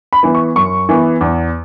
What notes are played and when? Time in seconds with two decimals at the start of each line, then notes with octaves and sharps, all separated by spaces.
0.13 B5
0.23 E3 B3
0.35 C#6
0.56 F#2 C#6
0.89 E3 B3
1.21 E2